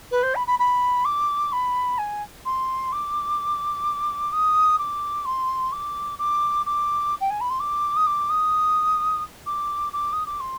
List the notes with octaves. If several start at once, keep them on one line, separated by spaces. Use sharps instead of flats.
B4
C5
B5
B5
B5
D6
B5
G#5
C6
D6
D#6
D6
C6
D6
D6
D6
G5
G#5
B5
C6
D6
D#6
D6
D#6
D6
D6
D#6
D6
C6